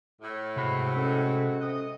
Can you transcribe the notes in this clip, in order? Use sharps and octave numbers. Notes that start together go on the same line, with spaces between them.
A2
G#2 C3 G#3 C4 F#4 B5
C#4 A4
C3 D#5